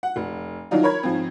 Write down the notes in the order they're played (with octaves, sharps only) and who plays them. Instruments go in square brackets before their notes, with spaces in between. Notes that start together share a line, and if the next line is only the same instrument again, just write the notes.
[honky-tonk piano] F#5
F1
D#3 E3 F#3 D4 D#4 F4
A#4 C#5 B5 G#6
G#2 F3 C4